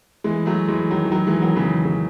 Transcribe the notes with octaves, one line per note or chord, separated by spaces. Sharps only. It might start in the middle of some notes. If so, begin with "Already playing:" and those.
E3 G#3
F#3 A3
E3 G#3
D#3 F#3
E3
D#3 F#3
E3 G#3
D#3 F#3
C#3 E3
C#3